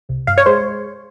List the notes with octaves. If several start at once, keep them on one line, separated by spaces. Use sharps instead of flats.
C2
G2 F5
C#5
G#3 C5